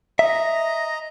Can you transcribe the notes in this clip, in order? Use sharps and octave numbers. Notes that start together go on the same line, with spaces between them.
D#5 E5 A#5